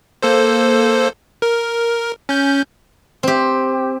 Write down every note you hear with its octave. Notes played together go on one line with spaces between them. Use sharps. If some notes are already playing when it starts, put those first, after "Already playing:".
A#3 A4 C5
A#4
C#4 G6
C4 G4